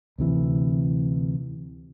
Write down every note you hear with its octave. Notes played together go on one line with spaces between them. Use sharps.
D2 C3 E3